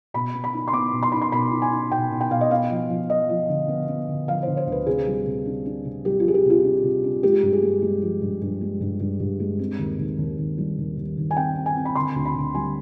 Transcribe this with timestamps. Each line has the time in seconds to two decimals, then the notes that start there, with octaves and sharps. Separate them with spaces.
0.14 B2 B5
0.34 B3
0.44 B5
0.53 D#4
0.68 C6
0.73 B3 D6
0.93 B2
1.03 C6
1.12 D#4 B5
1.21 C6
1.32 B2 B5
1.51 D#4
1.62 G#5
1.72 D#4
1.91 B2 G5
2.11 B2
2.21 G5
2.30 B2 F5
2.41 D#5
2.51 B3 F5
2.70 F3
2.90 F3
3.10 F3 D#5
3.29 F3
3.49 D3
3.68 B3
3.88 B3
4.08 D3
4.28 F3 F5
4.43 C5
4.47 D3
4.57 C5
4.67 D2 B4
4.86 C3 G#4
5.07 G3
5.26 C3
5.46 D4
5.65 D4
5.85 C3
6.05 G3 G4
6.20 F4
6.25 G3 G#4
6.34 G4
6.45 C3
6.50 F4
6.64 D4
6.83 C3
7.04 D4
7.23 G#3 G4
7.43 G2
7.53 G#4
7.62 G#3
7.82 G#3
8.02 F3
8.21 G2
8.42 G2
8.61 G#3
8.81 G2
9.00 G2
9.20 G2
9.40 G#3
9.59 C4
9.79 D#2
9.99 D#2
10.18 D#2
10.38 D#2
10.58 G3
10.78 D#2
10.97 D#2
11.17 D#2
11.31 G#5
11.37 C4 G5
11.56 C4
11.66 G#5
11.76 C4
11.85 B5
11.95 D3 C6
12.16 D2
12.25 B5
12.35 D2
12.55 G3 G#5